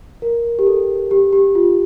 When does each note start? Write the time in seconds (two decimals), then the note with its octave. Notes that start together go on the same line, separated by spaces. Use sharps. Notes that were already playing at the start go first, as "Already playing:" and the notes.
0.22 A#4
0.59 G4
0.67 A4
1.11 G4
1.33 G4
1.55 F4